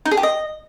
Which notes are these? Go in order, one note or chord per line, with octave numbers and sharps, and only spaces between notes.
D#4
G#4
G4
D#5